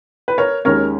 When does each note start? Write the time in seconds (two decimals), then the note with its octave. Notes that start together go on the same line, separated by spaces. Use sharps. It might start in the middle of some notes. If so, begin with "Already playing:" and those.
0.28 B4
0.38 A#4 C#5
0.65 D#2 D#3 G#3 C#4 A#4 C#5